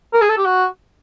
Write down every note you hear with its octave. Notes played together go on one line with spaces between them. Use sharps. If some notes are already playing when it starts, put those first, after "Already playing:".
A#4
G#4
A4
G4
F#4